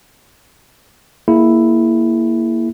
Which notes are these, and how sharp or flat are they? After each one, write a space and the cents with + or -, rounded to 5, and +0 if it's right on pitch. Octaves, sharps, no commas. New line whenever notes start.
A#3 +0 E4 +0 G#4 +10